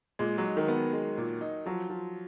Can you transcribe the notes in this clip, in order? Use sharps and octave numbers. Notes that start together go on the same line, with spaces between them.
A#2 G#3
F#3
D#4
D#3
B3
G#3
A#2
D#4
F3 F#3
F3